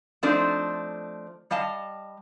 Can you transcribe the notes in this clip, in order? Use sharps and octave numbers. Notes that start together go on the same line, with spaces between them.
F3 A3 C4 D4 D#4 C5
G3 D#5 F5 A5